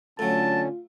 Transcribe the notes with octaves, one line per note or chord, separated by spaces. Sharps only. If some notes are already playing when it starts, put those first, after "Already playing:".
A2 D3 F#3 C#4 F4 A5